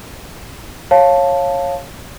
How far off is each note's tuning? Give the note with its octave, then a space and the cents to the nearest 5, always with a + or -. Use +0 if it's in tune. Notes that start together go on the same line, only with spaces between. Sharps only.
C#5 -15 F5 +0 A5 +0